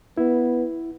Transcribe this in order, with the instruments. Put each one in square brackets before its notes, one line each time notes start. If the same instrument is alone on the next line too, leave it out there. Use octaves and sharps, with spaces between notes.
[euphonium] B3 [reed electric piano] E4